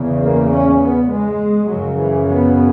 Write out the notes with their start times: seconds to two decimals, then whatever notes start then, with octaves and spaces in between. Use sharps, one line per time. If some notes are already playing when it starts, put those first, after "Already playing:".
Already playing: E2 C#3
0.22 A#3
0.50 C#4
0.80 B3
1.09 G#3
1.68 F#2 C#3 F#3
1.98 E3
2.27 B3